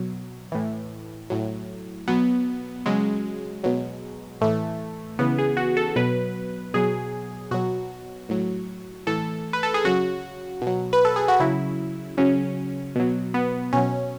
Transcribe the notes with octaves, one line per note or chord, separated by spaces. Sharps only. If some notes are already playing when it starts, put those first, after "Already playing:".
Already playing: B2 F#3
A2 E3
A2 F#3
B2 F#3 B3
C#3 F#3 G#3
B2 F#3
A2 E3 A3
C#3 E3 B3
G#4
F#4
A4
B2 F#3 B4
B2 F#3 G#4
B2 F#3 F#4
A2 F#3
A2 E3 A4
B4
A4
G#4
C#3 F#3 F#4
B2 F#3
B4
A4
G#4
F#4
C#3 F#3 E4
C#3 F#3 C#4
B2 F#3
B3
B2 F#3 C#4